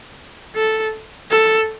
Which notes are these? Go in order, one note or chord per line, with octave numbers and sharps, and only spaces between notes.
A4
A4